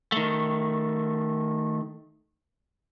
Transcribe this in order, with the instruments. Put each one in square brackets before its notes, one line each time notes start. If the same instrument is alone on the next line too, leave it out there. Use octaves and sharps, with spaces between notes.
[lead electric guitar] D#3 A3